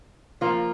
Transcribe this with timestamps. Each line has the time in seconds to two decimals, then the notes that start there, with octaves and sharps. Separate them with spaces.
0.41 F3 A#3 F4